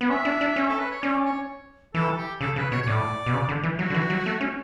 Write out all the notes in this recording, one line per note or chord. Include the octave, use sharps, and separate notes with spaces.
B3
C#4 E5
D4
D4
C#4
A4
B4
C#5
C#4 D5
C#5
E3 A4
G4
C#3 A4
C#3 B4
B2 C#5
C#5
A2 D5
B2
C#3
D3
E3
F#3 F#4
D3
E3
F#3
A3
C#4